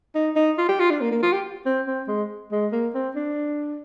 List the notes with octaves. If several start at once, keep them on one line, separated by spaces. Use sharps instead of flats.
D#4
D#4
F4
G4
F4
D4
A#3
A#3
F4
G4
C4
C4
G#3
G#3
A#3
C4
D4